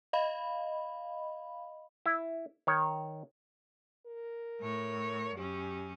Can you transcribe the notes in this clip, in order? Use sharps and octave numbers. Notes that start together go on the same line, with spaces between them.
D#5 F5 B5
E4
D#3 C#5
A#4
A2 C#5
F#2 C#4 G4